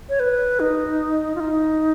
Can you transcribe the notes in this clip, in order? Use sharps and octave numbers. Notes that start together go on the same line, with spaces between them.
C#5
B4
D#4
F4
D#4